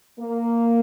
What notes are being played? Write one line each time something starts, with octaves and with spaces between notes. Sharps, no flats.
A#3